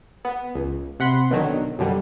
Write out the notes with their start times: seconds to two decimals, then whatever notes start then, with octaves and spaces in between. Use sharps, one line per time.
0.25 B3
0.55 C#2
1.00 C3 F#5 B5 C6
1.30 B1 B2 D3 D#3 F#3
1.79 F#2 B2 D3 G3